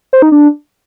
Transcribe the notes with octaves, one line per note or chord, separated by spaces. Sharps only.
C5
D#4
D4